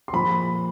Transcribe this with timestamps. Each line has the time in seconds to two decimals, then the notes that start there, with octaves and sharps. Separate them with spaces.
0.08 C6
0.13 A#2 F3 B5